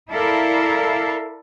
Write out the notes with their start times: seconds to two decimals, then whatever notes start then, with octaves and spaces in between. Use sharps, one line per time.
0.10 E4 A4 A#4 D5 E5 F5